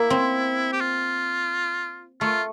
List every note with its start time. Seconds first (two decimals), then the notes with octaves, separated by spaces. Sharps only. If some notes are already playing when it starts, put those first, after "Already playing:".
Already playing: A#3 E4
0.10 C4
0.72 G4
0.81 F4
2.21 A3 F4